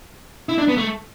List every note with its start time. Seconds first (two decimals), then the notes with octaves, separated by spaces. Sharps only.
0.49 E4
0.58 D4
0.68 B3
0.77 A3